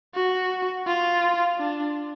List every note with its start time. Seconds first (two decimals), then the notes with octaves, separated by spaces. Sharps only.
0.15 F#4
0.87 F4
1.59 D4